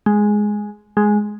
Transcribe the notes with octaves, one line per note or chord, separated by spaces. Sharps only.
G#3
G#3